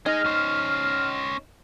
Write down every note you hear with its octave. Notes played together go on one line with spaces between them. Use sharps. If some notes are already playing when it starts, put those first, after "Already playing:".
D#4 G#4 D#5 F6
C#4 C5